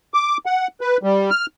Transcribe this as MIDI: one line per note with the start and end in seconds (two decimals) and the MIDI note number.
0.14 0.37 86
0.46 0.67 78
0.81 0.97 71
1.03 1.30 55
1.30 1.46 89